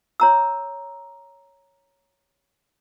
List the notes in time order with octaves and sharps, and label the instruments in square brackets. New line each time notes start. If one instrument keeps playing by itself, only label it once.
[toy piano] C#5 A#5 E6